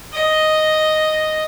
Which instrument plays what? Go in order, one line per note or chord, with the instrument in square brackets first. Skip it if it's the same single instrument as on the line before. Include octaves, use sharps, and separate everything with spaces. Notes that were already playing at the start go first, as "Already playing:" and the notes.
[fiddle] D#5